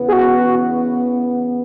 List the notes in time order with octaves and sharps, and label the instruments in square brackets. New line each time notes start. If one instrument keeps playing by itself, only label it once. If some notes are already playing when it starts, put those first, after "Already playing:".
Already playing: [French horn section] E2 C#3 E3 B3
[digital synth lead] G#4
F#4